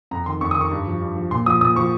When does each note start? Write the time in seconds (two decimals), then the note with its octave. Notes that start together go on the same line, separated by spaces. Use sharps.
0.11 F2 A#5
0.26 D#3 C6
0.41 F2 C#6
0.51 D#6
0.56 D#3 C#6
0.71 G2
0.87 F3
1.01 G2
1.16 F3
1.31 A#2 C6
1.46 F3 D#6
1.61 A#2 D#6
1.76 F3 C#6